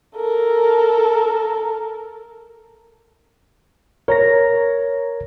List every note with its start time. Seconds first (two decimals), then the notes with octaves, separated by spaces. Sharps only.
0.15 A4 A#4
4.08 A#4 C#5 A#5 A#6